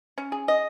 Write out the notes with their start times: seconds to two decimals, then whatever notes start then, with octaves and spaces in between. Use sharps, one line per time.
0.18 C#4
0.32 G#4
0.48 D#5